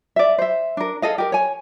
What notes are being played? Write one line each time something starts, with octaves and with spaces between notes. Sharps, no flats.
D5 E5
C5 E5
D4 A#4
G#4 A4 D#5 F5
G4 A#4
C#5 G#5